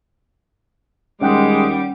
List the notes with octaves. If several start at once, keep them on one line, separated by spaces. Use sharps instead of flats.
D#2 G3 G#3 C#4 F#5 G5 D6